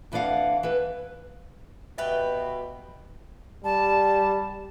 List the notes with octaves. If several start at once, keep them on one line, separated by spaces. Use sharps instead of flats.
F2 E3 D4 D5 F5 F#5
E3 B4
B2 G4 B4 E5 G5
G3 A5